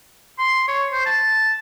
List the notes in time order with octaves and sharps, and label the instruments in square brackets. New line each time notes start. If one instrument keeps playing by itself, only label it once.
[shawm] C6
C#5
C5
A5